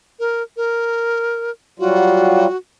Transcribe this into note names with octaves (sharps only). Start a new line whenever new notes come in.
A#4
A#4
F#3 G3 F4 F#4